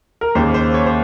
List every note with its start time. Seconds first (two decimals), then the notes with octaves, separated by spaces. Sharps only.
0.21 A#4
0.35 D#2 C#3 C5
0.54 C5
0.74 C#5
0.86 C5